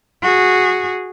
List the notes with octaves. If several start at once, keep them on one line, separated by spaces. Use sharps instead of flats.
F#4 G#4